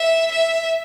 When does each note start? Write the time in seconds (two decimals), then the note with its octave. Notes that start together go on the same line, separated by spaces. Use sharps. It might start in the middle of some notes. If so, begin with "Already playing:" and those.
Already playing: E5
0.32 E5